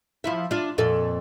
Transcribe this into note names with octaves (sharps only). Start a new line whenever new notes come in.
F3 E4 E5
D4 F4
F2 A#2 A4